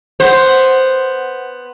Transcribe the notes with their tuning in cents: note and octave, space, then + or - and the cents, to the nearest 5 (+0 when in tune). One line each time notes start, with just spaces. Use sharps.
B3 +0 C5 +0